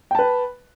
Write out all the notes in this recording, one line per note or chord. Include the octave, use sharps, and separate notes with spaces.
B4 G5 A5